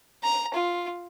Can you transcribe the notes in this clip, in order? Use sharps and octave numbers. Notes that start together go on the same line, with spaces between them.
A#5
F4